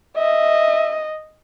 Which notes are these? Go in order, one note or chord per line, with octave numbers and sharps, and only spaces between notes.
D#5 E5